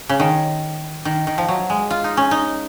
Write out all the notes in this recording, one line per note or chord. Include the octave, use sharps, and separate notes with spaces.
C#3
D#3
D#3
D#3
F3
F#3
G#3
F4
D#4
C#4
D#4